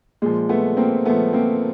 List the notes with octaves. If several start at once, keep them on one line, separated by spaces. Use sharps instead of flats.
A#2 F3 G#3
A3 B3
A#3 C4
A#2 F3 A3 B3
A#3 C4